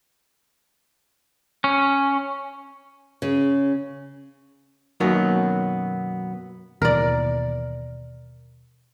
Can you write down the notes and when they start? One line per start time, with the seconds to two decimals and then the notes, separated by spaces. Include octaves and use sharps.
1.64 C#4
3.22 C#3
5.00 F#2 B2 D#3 F#3 A#3 B3
6.82 D#2 B2 E3 A#4 D5